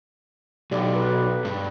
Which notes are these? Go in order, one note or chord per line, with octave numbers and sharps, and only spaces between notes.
B1 G4 D5
B4
G2